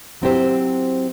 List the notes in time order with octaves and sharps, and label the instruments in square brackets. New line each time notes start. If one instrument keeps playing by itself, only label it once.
[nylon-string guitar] F#3 C4 E4 G4 C5